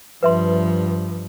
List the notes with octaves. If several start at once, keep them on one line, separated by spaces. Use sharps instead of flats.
G2 F3 B4 E5 C6